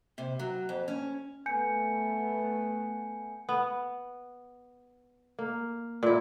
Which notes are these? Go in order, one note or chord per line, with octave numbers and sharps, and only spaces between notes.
C3
F#3
F2
C#4
A3 B3 G#5 G6 C#7
B3
A#3
A#2 E4